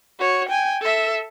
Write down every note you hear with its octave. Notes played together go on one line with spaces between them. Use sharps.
F#4 C#5
G5 G#5
A4 E5